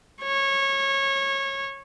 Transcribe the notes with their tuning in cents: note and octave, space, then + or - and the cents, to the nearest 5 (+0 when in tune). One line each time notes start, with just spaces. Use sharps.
C#5 -20